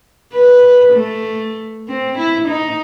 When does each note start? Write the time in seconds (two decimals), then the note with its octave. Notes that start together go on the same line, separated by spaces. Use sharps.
0.34 B4
0.93 A3
1.88 C4
2.18 E4
2.48 D#4